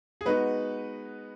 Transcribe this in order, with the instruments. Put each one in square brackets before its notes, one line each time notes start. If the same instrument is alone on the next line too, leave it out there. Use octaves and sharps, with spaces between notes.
[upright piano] G#4
[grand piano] G#3 D#4 F#4 [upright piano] B3 B4